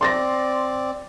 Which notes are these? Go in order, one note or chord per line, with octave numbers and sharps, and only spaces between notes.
C4 D5 C6 A6 A#6